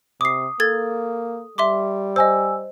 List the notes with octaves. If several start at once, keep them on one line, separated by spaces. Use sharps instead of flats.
C3 D6 D#6 C7
A#3 A4 G#6 A6
G3 E5 C6 D6
C5 D#5 G#5 E6